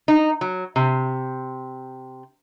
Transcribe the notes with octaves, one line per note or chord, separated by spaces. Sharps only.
D#4
F#3
C3